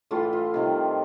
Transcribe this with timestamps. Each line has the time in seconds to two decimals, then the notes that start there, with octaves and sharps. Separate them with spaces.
0.11 A2 E3 A3 F4
0.33 F4
0.54 C3 D#3 G3